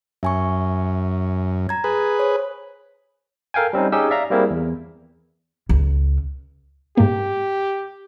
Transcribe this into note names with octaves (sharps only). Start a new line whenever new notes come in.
F#2 E5 G#5 C#6
A#5 G#6
G#4 B4
C5 C#5
A4 A#4 F5 G5 G#5
G3 C4 C#4 D#4
C#4 D#4 G4 G#4 E6
D5 E5 F5 A#5
G3 A#3 C4 E4 G#4 A#4
E2
C#2
G#2 A#3 G4